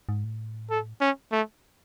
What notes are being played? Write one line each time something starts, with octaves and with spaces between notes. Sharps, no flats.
G#2
A2
A4
C#4
A3